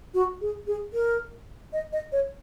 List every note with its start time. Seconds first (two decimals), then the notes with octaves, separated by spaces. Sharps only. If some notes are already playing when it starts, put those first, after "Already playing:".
0.14 F#4
0.41 G#4
0.67 G#4
0.93 A#4
1.73 D#5
1.93 D#5
2.12 C#5